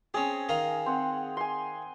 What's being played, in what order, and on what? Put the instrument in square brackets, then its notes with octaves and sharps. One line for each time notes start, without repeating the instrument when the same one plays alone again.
[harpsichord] C4 C#4 [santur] G#4
[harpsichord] D#3 F4 A#5
[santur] C4 F#5
G#5 C6